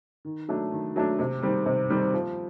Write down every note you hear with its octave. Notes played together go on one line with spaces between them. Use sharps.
D#3
F#3 A3 D4
D#3
F#3 A3 D4
C3
D#3 G3 C4
C3
D#3 G3 C4
F3